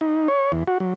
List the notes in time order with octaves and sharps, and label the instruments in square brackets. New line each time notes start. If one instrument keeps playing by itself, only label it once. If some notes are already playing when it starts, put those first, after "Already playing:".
[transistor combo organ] D#4
C#5
E2
F#4
F#3